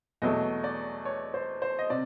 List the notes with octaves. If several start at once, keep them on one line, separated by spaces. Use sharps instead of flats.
E2 B2 F#3 A3 D#5
D5
C#5
C5
C5
D#5
C3 D5